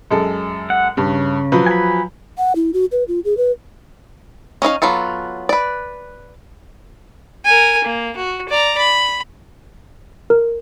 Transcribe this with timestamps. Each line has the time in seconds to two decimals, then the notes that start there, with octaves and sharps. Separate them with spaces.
0.11 F#2 G#3 A4
0.70 F#5
0.97 G2 C#3
1.52 F3 F#3 B4
1.67 G#5 B5
2.38 F#5
2.55 E4
2.74 F#4
2.92 B4
3.08 F4
3.25 G#4
3.37 B4
4.62 C#4 D#4 E4 F5
4.82 F#3 B3 F4 A4
5.49 B4 D5
7.45 A#4 G#5
7.84 A#3
8.17 F#4
8.49 D5 A#5
8.78 B5
10.30 A#4